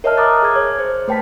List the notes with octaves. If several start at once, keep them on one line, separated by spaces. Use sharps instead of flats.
A#4 C#5 D#5 E5 A5 F6
A#5 D6 D#6 F6 F#6 A6
G#4 G#6
C#5
C5
A3 B4 G5 A5 B6